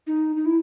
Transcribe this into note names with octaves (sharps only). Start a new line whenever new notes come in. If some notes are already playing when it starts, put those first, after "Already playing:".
D#4
D#4
E4